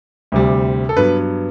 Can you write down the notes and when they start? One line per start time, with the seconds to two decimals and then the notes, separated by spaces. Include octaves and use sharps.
0.32 D2 C3 G3
0.89 A4
0.97 G2 F#3 B3 B4